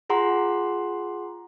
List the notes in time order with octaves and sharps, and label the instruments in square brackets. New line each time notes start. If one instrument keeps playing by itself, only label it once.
[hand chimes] F4 G#4 F#5 A#5 C6